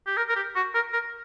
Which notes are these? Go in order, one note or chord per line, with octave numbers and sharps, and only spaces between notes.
G4
A#4
A#4
G4
F#4
A#4
A#4